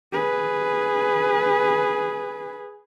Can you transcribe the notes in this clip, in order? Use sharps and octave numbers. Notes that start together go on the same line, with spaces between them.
G#4 B4